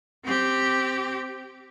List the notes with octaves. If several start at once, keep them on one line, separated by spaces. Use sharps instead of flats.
C4 G4